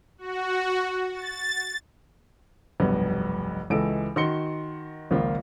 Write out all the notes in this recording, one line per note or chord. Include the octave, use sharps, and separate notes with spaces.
F#4
A6
F1 B1 G2 B3
C#2 E3 G#3 A4 D7
D#3 F#4 C6 C#7 G7
G#1 C#2 F3 A#3 F4